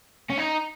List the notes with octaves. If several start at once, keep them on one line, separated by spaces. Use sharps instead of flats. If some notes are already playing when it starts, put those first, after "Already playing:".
C#4
D#4